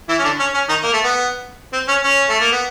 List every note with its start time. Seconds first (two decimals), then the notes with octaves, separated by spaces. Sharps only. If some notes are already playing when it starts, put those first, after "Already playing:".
0.09 E3 E4
0.19 C#4
0.24 D3 D4
0.39 C#4
0.54 C#4
0.69 D#3 D#4
0.83 A#3
0.93 A3
1.04 B3
1.73 C4
1.88 C#4
2.04 C#4
2.29 A3
2.41 A#3
2.52 B3